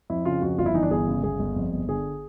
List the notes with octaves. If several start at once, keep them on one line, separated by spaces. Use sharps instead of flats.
F2 E4
C#3 F4
F2 F#4
G1 F4
E4
E3 D#4
D4
G1 G#4
C#3
G1 G#4
G1
F2
G1
D3 G#4